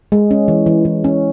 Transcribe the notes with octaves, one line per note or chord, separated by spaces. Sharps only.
G#3
C#4
E3
E3
E3
C#4